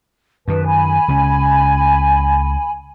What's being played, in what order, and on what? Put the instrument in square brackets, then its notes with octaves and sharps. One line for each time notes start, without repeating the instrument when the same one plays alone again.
[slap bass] F#2 D#3 [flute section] B4 A5
[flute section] G#5 B5
[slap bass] C#2 C#3 C#4